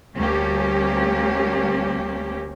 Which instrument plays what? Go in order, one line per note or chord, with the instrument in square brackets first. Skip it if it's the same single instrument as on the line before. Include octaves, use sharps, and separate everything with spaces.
[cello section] D2 G3 A#3 C#4 G4